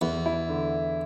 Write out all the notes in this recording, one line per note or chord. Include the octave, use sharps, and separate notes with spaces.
E2 E4
E4
D3